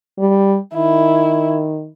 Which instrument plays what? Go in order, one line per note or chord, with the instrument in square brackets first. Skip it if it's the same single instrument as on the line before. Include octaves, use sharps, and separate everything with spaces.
[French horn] G3
[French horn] D#3 [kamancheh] E4